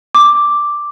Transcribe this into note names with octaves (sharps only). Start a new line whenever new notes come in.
D6